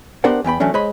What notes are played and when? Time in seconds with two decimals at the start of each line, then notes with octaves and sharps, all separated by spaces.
0.24 B3 D4 G4 A#4 C5 F#5
0.44 E2 B3 G5 B5
0.60 E3 F#3 A3 C#4 D4
0.74 G#3 C5 C#5 D#5 B5